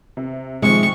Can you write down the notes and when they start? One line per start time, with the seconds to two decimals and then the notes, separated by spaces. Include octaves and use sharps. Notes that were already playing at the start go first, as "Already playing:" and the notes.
0.17 C3
0.62 C3 D#3 F3 G#3 C#6